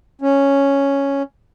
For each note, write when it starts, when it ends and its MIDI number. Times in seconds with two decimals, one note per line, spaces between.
0.22 1.23 61